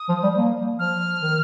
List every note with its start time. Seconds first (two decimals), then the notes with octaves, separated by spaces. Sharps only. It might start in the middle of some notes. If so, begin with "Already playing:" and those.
Already playing: D#6
0.09 F3
0.23 G3
0.37 A#3
0.79 F3 F6
1.22 D#3